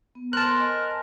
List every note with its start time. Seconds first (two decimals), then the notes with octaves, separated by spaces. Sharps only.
0.15 B3
0.33 A#4 C5 A5 F#6
0.57 D#5 G#5